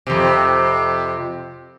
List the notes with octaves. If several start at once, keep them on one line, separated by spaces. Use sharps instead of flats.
F2 C3